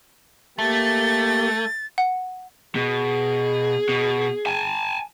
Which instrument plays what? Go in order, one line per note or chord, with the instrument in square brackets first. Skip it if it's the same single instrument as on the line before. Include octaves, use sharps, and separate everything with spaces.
[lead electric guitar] A3 [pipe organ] A#3 G4 [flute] A6
[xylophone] F#5
[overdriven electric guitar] B2 [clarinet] G#4
[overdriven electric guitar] B2
G#5 A5